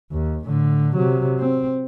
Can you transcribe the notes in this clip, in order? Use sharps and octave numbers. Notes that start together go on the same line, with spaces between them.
D#2
A2 D3
C3 F#3
C4